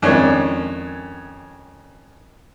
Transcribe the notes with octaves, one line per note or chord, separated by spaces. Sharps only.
F2 D#3 G#3 C#4 D4 E4